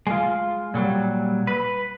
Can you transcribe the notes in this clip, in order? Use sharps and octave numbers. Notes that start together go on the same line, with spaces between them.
G#3 F4
A#2 F#3 G3
B4